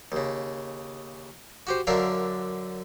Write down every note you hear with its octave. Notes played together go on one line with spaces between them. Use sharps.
D#2 C#3
F#4 G4 C5
F#2 D3 D4 A#4 E5 F5